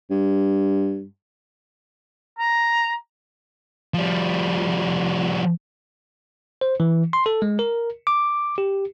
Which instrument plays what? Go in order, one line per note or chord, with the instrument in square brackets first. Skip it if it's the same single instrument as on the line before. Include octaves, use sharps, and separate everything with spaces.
[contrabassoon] G2
[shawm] A#5
[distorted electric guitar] F3 G3
[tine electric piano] C5
E3
C6
A4
G#3
A#4
D6
G4